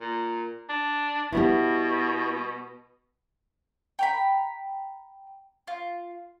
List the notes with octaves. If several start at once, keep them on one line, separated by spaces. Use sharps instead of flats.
A#2
D4
B2 G3 B3 E4
G5 A#5 B5
F4